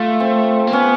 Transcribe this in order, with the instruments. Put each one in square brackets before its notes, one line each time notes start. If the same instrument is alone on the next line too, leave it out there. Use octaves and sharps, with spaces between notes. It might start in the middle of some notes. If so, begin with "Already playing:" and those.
Already playing: [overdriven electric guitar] A3 [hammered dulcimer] F4
[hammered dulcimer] C4
[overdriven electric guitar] A#3
[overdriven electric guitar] B3 [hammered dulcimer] C#4